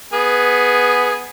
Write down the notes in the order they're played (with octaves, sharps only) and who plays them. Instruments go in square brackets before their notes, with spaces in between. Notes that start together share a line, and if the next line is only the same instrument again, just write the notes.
[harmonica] B3 G#4